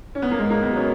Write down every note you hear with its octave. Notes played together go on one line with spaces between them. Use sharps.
C#4
B3
A#3
G#2 G#3
G#2 A#3
B3
F#3 C#4